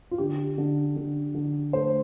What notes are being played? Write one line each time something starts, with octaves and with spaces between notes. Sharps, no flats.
F4
D3 G4
D3
D3
D3
A3 C5